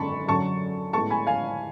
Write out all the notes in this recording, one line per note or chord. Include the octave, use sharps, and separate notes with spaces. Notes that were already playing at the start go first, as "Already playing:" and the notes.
Already playing: F#2 D3 G#3 B3 A5 B5 C#6
F#2 D3 F#3 A5 C#6
A2 G#3 B3 A5 C#6
G#5 B5
F5 G#5